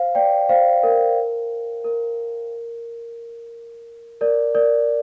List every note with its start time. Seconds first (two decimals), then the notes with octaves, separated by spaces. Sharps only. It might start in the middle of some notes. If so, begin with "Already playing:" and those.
Already playing: C5 F5
0.15 D5 G5
0.49 C5 F5
0.83 A#4
1.84 A#4
4.21 A#4 D5
4.55 A#4 D5